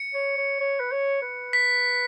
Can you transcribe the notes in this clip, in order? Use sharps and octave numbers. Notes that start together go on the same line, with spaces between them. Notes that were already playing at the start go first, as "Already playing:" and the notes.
Already playing: C#7
C#5
C#5
C#5
B4
C#5
B4
B6